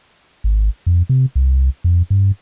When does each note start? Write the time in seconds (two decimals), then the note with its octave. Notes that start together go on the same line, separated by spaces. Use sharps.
0.44 G#1
0.86 F2
1.09 C3
1.35 C2
1.84 F2
2.10 G2